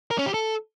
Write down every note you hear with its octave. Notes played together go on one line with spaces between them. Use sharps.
A#4
C#4
G4
A4